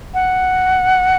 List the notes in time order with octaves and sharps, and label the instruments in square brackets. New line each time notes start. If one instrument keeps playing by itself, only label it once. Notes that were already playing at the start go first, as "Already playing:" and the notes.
[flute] F#5